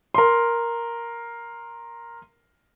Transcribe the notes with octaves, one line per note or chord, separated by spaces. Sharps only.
A#4 C6